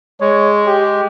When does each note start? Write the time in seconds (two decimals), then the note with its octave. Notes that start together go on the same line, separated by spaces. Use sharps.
0.20 G#3 C#5
0.67 G4